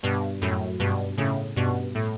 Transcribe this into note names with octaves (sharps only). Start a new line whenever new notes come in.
G2 B2
F#2 A2
G2 B2
A2 C#3
G2 B2
A2